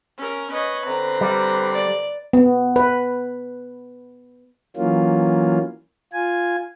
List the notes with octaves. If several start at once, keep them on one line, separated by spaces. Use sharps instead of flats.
C#4 A#4
B4 C#5 D#5
D3 C4 A#5
G3
D5
B3
B4
E3 F#3 A#3 C#4 F4
F4 G#5